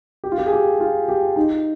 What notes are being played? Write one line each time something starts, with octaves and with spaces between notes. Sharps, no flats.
G4
F4
G4
G#4
G4
F4
G4
D#4